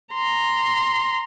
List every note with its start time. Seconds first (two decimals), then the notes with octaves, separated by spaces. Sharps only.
0.13 A#5 C6